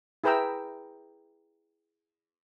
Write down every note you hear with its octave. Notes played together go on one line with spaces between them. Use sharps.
E4 G#4 B4 G5 A#5 E6